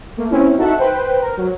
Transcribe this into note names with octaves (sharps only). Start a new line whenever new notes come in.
A3 A#3
C4 C#4 E4
D#4 F#4 A4 E5 F#5
B4 C5 G5
A#4
F#3